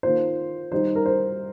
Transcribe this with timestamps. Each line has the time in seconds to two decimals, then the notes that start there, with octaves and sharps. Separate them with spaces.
0.03 D#3 A#3 F4 C5
0.72 D#3 G3 D#4 C5
0.96 A#4
1.06 C5